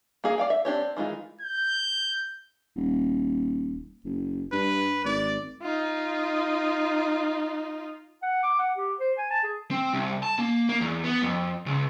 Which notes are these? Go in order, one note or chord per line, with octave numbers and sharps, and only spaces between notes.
A#3 G#4 F5
D5 F5 G5
E5
C4 D4 G4 C#5
C4
D#3 E3 G#3 F4
G6
D#1
F#1
G2 B4
G#1 D5
D#4 F4
F#5
D6
F#5
G4
C5
G#5
A5
G#4
C4
C2
A5
A#3
A#3
E2
B3
F2
C#2